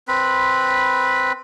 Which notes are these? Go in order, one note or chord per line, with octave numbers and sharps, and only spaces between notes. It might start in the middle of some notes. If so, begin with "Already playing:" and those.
C4 B4 B5